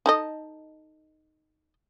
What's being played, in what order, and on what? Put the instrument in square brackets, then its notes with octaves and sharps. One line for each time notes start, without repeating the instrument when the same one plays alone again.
[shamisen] D#4 A4 D#5